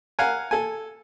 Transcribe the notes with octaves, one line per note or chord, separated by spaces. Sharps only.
A#4 F5 F#5 G#5
A4 G#5